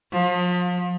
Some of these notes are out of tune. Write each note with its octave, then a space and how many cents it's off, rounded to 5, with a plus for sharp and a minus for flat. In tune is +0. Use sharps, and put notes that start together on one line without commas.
F3 +35